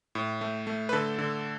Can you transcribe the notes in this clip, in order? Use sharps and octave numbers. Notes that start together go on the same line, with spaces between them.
A2
A3
A3
B4
D3 A4
D3